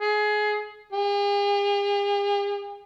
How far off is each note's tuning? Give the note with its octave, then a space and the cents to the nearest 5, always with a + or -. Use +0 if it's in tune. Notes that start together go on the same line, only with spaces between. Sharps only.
G#4 +20
G#4 -45